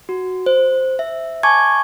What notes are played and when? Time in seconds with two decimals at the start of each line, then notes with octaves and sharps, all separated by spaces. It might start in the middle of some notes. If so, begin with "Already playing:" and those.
0.09 F#4
0.46 C5
0.99 E5
1.43 G#5 A5 C#6 D6 G#6